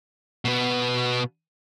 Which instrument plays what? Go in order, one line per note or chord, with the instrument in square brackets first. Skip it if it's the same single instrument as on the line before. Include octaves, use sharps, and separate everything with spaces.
[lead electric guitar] B2 B3